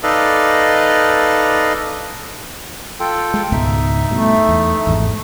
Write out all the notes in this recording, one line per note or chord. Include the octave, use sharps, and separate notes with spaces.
D#4 A4 B4 D5 D#5 F5
F4 A4 G5
G#3
C#2 G#2 B2 D#4 E5
G2 B2 A3
E2
G#1 E2 G#2